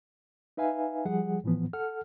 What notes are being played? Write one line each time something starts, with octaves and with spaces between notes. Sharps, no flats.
D#4 B4 E5 F5 G#5
F3 G3 G#4 F#5
A2 E3 F3 B3
A4 F#5 F6